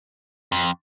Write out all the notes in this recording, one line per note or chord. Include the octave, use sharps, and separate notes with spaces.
F2